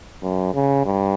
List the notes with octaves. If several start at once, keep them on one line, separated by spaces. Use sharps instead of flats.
F#2
C#3
G2